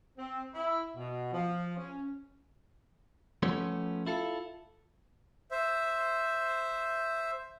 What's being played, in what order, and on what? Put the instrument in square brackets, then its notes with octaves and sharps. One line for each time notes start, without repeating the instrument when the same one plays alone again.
[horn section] C4
E4
B2
F3
C#4
[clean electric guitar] F3 A3 B3 C#4
E4 F4 A4
[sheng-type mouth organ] C5 E5